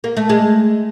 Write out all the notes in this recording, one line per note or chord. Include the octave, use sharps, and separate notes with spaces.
A#3
A3
G#3